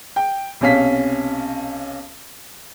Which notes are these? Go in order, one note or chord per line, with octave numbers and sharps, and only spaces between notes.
G5
B1 C3 C#4 F5 B6